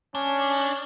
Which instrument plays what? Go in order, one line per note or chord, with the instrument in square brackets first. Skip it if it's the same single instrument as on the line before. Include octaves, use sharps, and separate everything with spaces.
[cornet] C#4 [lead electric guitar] D4